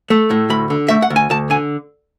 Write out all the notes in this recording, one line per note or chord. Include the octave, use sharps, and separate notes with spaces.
A3
A2
D2 B5
D3
A3 E5
F#5
D2
G#5
D2 A5
D3 G#5